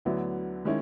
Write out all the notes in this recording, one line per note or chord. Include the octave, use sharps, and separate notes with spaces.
D2 D3 F#3 B3 E4
D#3 G#3 C#4 E4